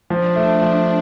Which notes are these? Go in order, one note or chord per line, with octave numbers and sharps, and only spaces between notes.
F3 D4
A3
F3